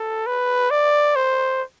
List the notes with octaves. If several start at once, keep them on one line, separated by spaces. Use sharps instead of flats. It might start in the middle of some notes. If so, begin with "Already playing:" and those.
Already playing: A4
B4
D5
C5